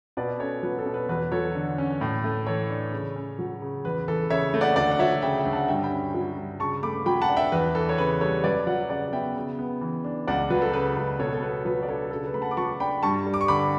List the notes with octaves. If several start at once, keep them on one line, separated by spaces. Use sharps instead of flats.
B2 B4 D5
C#4 A4 C#5
F#3 B4
A4
B2
B4
E2 B4
F#3 A4 C#5
D3
C#4
A2
A3
E3 A4 C#5
D4
C#3
C#4
F#3
C#3
E2 B4
E3 A4
C#3 C#5 E5
A3
D5 F#5
D2 D5 F#5
F#5
F#3 C#5 E5
C#3 E5 G5
E5 G5
D2
F#5 A5
G2 E5 G5
G5 B5
C#4
F#3
G2
C#3 A5 C#6
A3 B5 D6
F#3 G5 B5
F#5 A5
D4
E5 G5
E2 B4
E3 A4
C#5
C#3 B4
G3 A4 C#5
F#2 B4 D5
F#3 D5 F#5
C#3 D5 F#5
B3 E5 G5
C#3
B3
E3
D4
C#2 D5 F#5
F#3 B4
A4
C#3 B4
C#2 B4
B2 A4 C#5
A4
B3 B4
F#3 B4
D5
D4 A4 C#5
C#3 A4
B4
A3 B5
F#5 A5
D6
F#3 A5 C#6
D4 G5 B5
G2 A5 C#6
G3
D6
C#6
D3 B5 D6